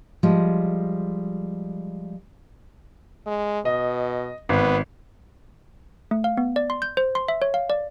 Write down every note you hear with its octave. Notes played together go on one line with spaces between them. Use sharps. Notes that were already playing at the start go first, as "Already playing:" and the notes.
F3 G3 G#3
G#3
B2 D#5
G#1 B3
A3
F5
B3
D5
C6
G6
C5
C6
E5
C#5
F5
D5